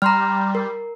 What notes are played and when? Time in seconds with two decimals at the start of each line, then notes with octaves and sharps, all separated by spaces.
0.02 G3 A#5 C6 F6
0.55 A#4